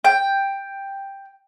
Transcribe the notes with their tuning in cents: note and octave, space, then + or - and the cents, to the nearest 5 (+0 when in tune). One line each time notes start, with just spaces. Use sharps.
G5 +5